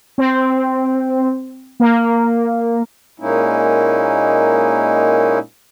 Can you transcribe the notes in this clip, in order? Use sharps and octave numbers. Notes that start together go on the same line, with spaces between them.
C4
A#3
A#2 G#3 A#3 C#4 D#4 E4